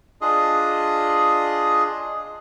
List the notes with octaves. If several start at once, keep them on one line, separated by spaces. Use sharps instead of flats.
D4 F4 G#4 D#5